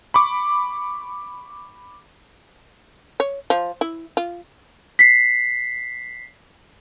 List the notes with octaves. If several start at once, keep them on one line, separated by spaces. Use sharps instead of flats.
B5 C#6 D6
C#5
F3
E4
F4
B6 C7